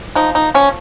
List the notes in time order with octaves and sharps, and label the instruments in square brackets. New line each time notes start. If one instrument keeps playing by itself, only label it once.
[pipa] F3 D#4
D#4
F3 C#4